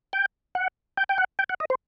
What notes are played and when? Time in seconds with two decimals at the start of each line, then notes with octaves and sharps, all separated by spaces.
0.13 G5
0.55 F#5
0.98 G5
1.09 G5
1.18 F#5
1.39 G5
1.49 F#5
1.60 D#5
1.70 C5